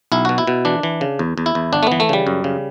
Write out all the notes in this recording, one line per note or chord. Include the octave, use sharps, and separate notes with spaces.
B1 E4
B2 F#4
E4
B2
E3 D4
E3
C#3
E2
E2
E4
E2
G1 D4
A3
E3 B3
A3
C#3 G3
F#2
C#3